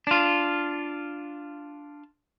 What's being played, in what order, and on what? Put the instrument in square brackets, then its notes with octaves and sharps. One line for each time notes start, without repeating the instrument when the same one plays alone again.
[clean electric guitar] D4 F4